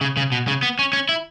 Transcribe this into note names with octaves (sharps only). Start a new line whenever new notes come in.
C#3
C#3
B2
C#3
B3
C#4
C#4
E4